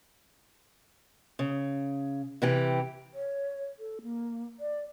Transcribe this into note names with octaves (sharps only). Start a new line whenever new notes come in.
C#3
C3 E3 G4
C#5
A4
A#3
D5